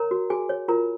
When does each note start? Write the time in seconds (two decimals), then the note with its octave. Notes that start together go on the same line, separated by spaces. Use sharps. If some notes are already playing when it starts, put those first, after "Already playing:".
Already playing: A#4 C#5 A#5
0.11 F#4
0.30 F#4 G#4 G#5
0.49 C#5
0.68 F4 A#4 A#5